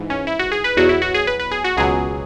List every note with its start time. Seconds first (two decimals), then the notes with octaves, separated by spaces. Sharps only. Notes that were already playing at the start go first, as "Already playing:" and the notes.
Already playing: G#2 E3
0.10 C#4
0.27 E4
0.39 F#4
0.52 G#4
0.64 B4
0.77 E2 B2 F#3 F#4
0.89 E4
1.02 F#4
1.14 G#4
1.27 B4
1.39 B4
1.51 G#4
1.64 F#4
1.77 C#2 B2 F#3 G#4